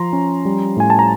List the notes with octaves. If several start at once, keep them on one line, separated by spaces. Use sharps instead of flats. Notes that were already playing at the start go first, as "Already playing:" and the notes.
Already playing: F3 A#5 C6
C#4
G3
A2 G#5
A5
A#5